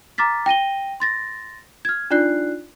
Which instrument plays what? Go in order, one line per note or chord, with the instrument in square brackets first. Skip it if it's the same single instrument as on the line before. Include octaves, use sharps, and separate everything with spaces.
[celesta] A#5 D6 F6 A6 B6
G5 A#6 D#7 G7
C6 A6 A#6
F6 G#6
D4 D#4 F4 D5 F#6 C7